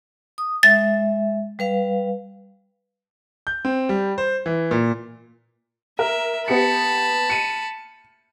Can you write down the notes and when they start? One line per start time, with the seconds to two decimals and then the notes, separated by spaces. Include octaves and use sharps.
0.38 D#6
0.63 G#3 E5 A6
1.59 G3 B4 F5
3.47 G6
3.65 C4
3.89 G3
4.18 C5
4.46 E3
4.71 A#2
5.99 A#4 E5
6.48 B3 G4 A5 B5 C#7
7.30 C#7 D#7